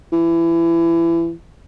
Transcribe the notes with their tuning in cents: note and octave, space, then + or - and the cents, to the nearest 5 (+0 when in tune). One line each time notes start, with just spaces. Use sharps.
E3 +25